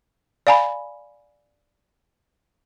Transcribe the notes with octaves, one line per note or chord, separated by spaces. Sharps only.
D5 F5 G#5 A#5 B5